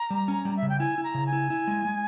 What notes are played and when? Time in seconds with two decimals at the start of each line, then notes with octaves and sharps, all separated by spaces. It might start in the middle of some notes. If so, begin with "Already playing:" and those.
Already playing: A#5
0.10 G3
0.28 C#4
0.45 G3
0.57 E5
0.62 C#3
0.69 G5
0.80 E4 G#5
0.98 E4
1.04 A#5
1.14 C#3
1.27 G#5
1.33 E4
1.50 E4
1.67 G#3
1.85 G#3